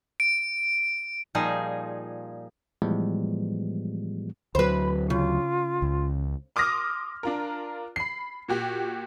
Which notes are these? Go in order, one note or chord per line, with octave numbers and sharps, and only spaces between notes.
D7
A#2 F3 G3 D#4 G#4
A2 E3 F3 G3 G#3 B3
D2 F#3 B4 C5 B5
C#3 F4
C#2
C6 D6 D#6 F6 A#6
D4 F4 A#4
B5 C7
A#2 F#4 G4